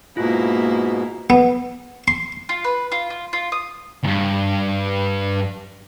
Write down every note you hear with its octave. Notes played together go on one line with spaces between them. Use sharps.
G#2 B2 A#3 E4 F4
B3
C6
F4
B4
F4
F4
F4
D#6
D2 G2